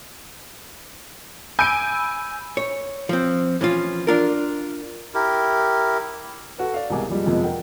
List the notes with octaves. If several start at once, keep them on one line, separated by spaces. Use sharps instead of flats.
G#5 B5 E6 G6 D7
C#5
F3 C4
E3 F3 C#4 F4
D4 F4 A#4
E4 G4 A#4
F#4 A4 B4
D5 F5
C2 B2 G#3 A#4 G#5 D6
F2 G3 G#3
F2 C3 G#3 B3
A#4 F#5 G5